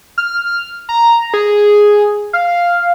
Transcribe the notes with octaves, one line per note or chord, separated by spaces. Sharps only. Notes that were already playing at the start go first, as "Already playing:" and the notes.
F6
A#5
G#4
F5